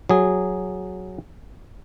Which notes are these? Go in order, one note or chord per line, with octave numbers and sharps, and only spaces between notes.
F#3 G#4